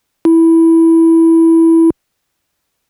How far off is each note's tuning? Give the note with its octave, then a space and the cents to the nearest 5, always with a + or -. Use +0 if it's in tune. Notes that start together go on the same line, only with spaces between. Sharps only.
E4 -5